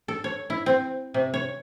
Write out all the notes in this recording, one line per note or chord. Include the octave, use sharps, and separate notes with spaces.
A4
C#5
E4
C4
C3
C#5